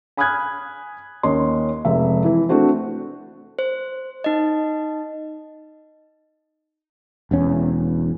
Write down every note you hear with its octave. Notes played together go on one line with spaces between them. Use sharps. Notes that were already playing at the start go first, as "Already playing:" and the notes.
G#5 B5 D#6 F6 F#6 G#6
D#2 C#4 D#5 C6
F1 G#3 E5
E3 E4
A3 C4 D4 F#4 C5
C5
D#4 D#5
E1 E2 C#4